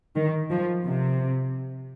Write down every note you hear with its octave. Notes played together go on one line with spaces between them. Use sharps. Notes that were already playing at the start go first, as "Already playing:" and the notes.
D#3
F3
C3